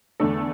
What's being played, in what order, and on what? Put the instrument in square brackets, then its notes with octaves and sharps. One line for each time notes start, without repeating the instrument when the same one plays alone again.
[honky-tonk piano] E2 D3 A3 D4 A4